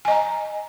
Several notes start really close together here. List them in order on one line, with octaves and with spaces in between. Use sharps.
G#5 D#5 A#5